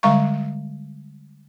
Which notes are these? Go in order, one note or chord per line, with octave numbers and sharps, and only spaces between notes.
D3 G3 G#3 F5 A#5 C#6